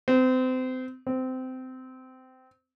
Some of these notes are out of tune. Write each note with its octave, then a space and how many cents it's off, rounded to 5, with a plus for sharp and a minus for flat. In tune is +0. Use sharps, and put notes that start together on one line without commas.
C4 -30
C4 -20